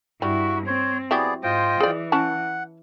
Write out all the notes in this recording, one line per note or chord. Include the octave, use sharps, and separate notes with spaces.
G2 G3 E4 F#4
C4 C5 C#5
F#3 B3 E4 G4 G#4 D5
G#2 F4 C5 D#5 G5
E3 G#4 D5
C#4 E4 F#5 A5